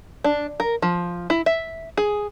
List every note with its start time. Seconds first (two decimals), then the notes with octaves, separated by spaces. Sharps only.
0.24 D4
0.60 A#4
0.82 F3
1.30 E4
1.46 E5
1.97 G#4